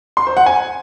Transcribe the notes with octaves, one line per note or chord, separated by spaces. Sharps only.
C6
C5
F#5
G#5